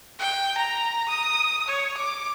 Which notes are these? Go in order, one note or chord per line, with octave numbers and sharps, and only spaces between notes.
G5
A#5
D#6
C#5
D6